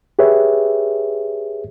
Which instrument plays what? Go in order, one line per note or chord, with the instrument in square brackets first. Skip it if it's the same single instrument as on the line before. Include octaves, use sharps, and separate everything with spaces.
[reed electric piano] G4 G#4 B4 C#5 E5